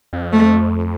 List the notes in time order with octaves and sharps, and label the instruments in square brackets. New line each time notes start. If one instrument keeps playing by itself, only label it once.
[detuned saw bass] F2
[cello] A3